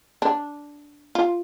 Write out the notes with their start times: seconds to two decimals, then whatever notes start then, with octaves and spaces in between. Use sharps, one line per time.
0.22 D4
1.15 F4